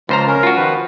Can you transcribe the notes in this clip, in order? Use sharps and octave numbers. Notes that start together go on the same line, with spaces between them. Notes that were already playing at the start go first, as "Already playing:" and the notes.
C#2 F3 F4 C5 A#5
C#4 A#4
F4 F#4
D#3 F3 B4